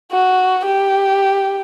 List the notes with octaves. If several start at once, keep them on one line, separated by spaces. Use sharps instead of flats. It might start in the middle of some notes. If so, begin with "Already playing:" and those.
F#4
G4